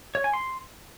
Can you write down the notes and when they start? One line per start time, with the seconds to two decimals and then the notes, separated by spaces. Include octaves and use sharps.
0.15 C#5
0.24 G#5
0.33 C6